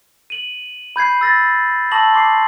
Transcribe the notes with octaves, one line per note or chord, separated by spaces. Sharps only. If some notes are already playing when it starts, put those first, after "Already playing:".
D#7 F#7
B5 G6 G#6 C7
E6 A6 A#6
A5 C#6 D#6 E6 A#6 F#7
C6 D6 C7